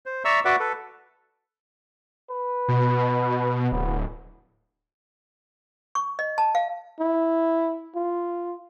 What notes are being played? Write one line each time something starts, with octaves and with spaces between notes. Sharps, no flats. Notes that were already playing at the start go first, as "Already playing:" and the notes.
C5
D5 E5 A#5 C#6 E6
F#4 B4 D5 E5 F#5 D6
A4 B4
B4
B2
D1 B3
C#6
D#5
A5
F5
E4
F4